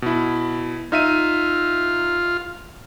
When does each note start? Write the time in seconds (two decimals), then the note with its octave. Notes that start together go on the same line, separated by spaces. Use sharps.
0.02 B2 E4
0.92 D#4 F4 E5 D#7